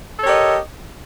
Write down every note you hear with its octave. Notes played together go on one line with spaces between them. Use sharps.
G4 A4 A#4 C#5 D#5